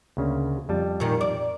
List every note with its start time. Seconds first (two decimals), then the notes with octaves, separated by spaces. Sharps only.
0.17 D2 C#3 A#3
0.69 F2 G3 A5
1.00 A#2 D#3
1.21 D5